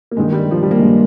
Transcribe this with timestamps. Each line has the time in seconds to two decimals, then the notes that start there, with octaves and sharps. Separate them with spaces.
0.11 A#3
0.17 G2 D#3 G#3
0.33 G3
0.51 F3
0.63 G3
0.71 A#3
0.78 G2 D#3 G#3